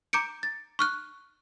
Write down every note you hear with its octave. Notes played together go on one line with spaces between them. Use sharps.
A#5 D6 G6 C#7 D7
A6
C#6 F6 F#6